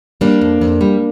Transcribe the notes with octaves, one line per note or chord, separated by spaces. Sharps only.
G3 A#3 D4
F2
F2
G3